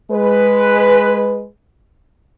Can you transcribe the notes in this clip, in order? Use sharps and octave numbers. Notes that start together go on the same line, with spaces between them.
G#3 B4